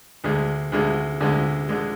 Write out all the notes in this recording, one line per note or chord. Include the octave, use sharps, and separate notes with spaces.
D2 D3 G#3
D2 D3 G#3
D2 D3 G#3
D3 G#3